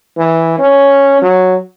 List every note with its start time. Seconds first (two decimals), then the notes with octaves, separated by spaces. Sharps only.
0.17 E3
0.59 C#4
1.22 F#3